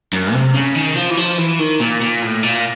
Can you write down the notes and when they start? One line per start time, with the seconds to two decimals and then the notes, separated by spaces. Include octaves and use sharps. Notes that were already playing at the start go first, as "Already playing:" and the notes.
0.13 F#2
0.33 C3
0.55 C#3
0.75 D#3
0.96 F3
1.10 E3
1.17 F3
1.38 E3
1.59 D#3
1.80 A#2
2.01 A#2
2.22 A2
2.43 A#2